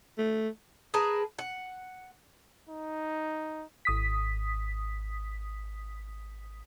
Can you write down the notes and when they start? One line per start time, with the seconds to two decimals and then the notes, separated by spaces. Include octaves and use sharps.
0.18 A3
0.94 G#4 A#4 B4 A5
1.39 F#5
2.69 D#4
3.85 G#1 D#6 B6